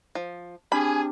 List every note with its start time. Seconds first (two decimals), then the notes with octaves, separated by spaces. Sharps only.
0.15 F3
0.72 C4 D4 G4 G#4 G#5 B5